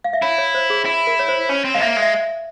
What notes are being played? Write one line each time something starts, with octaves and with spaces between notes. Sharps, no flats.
F5
E5
E4 C#5
C#5
C5
G#4
E4
A#4
C#5
C5
C#4 C#5
C4
G#3 F5
A#3 E5
G#3
E5